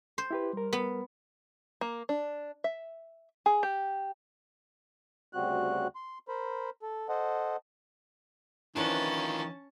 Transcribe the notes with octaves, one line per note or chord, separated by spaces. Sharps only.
C5
E4 G4 B4
G3 A#4
B3
A#3
D4
E5
G#4
G4
D2 C#3 G3 C4 F#4 F#6
C6
A#4 C5 B5
A4
A4 C5 D#5 F#5
D#3 E3 C#4 D4 E4 F4 B4 A5